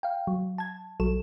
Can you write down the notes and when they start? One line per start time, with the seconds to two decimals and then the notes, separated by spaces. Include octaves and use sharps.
0.03 F5 G5
0.27 F#3
0.58 A5 G#6
1.00 B1 F#3 A4 E7